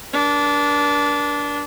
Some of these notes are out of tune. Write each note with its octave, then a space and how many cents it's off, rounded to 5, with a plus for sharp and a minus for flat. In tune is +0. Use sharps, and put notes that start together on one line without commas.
D4 -20 A#4 +45